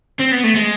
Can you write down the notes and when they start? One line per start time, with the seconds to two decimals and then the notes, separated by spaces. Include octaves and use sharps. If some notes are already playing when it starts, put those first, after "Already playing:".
0.19 C4
0.32 B3
0.44 A3
0.55 G#3